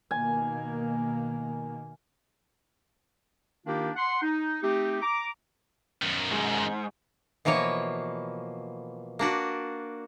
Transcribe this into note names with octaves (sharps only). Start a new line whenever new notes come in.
B2 D#3 A#3 G#5
D#3 A#3 D4 D#4 F4 G4
F#5 C6
D#4
A3 C4 D#4 G4
A#5 D6
F#2 D#3
G#2
B2 E3 F3 A#3 C#5
A#3 D4 F#4